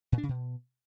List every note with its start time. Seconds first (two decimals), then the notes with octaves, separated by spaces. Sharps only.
0.12 A#2
0.18 D4
0.23 C#3
0.29 B2